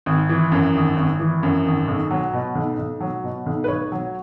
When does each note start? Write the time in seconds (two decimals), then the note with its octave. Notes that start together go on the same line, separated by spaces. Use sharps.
0.06 G#1
0.29 E3
0.52 F#2
0.75 G#1
0.97 G#1
1.19 E3
1.43 F#2
1.65 G#1
1.88 B1
2.11 F#3
2.33 B2
2.55 B1
2.78 B1
3.01 F#3
3.24 B2
3.46 B1
3.64 B4
3.68 B1 C#5
3.92 F#3